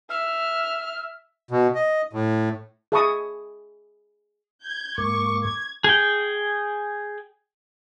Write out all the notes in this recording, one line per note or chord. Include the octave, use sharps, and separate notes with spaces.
E5 F6
B2
D#5
A2
G#4 E5 A5 B5 C#6 D#6
G6 G#6
G#2 A#3 C#6 D6
G#6
G#4 G5